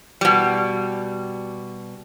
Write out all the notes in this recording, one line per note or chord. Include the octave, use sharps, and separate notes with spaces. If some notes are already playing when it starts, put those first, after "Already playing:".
B2 G3